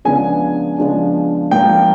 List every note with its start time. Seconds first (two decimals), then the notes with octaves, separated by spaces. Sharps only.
0.05 C#3 F3 G#3 B3 D4 G#5
0.78 C#3 F3 G#3 B3 D4
1.51 G#2 F3 A#3 D4 G5